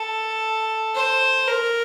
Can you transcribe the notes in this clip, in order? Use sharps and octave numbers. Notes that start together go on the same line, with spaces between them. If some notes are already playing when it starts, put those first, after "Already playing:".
Already playing: A4
C5
A#4